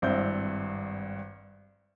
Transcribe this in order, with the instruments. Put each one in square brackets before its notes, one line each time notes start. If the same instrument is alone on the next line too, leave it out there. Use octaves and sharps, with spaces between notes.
[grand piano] G#1 G2 C4 E4 E5 G6